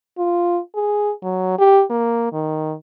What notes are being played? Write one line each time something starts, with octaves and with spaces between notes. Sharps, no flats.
F4
G#4
F#3
G4
A#3
D#3